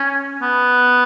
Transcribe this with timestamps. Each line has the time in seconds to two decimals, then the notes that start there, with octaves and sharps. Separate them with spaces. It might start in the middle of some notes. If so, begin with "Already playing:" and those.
Already playing: C#4
0.42 B3